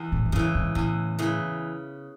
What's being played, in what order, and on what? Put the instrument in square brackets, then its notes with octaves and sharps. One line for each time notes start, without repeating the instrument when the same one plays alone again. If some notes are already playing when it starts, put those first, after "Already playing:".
Already playing: [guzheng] E2
[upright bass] A2
F#2
[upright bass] G#2 [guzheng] C#3 E3
[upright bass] G#2
[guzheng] E2 [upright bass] A2
[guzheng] C#3 E3